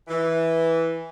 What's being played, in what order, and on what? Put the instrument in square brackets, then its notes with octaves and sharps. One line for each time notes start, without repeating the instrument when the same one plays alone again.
[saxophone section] E3